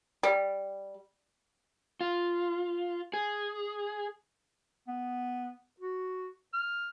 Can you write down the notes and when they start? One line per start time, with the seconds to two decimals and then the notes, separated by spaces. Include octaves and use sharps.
0.23 G3
2.01 F4
3.14 G#4
4.88 B3
5.80 F#4
6.53 F6